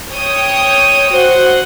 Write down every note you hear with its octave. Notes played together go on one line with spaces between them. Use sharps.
C#5 G5 D#6
F#4 C5 F#5